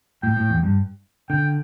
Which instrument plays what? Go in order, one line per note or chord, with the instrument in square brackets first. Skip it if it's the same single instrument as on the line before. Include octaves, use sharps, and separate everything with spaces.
[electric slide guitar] A2 [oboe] G5
[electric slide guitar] A2
E2
G2
[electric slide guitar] D3 [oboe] G5